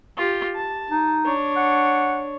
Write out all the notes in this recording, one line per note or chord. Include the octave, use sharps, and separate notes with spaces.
F4 G4
A5
D#4
D4 C#5
F#5